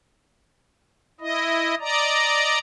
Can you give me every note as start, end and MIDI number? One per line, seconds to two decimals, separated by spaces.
1.21 1.75 64
1.21 1.75 75
1.80 2.58 74
1.80 2.58 75
1.80 2.58 82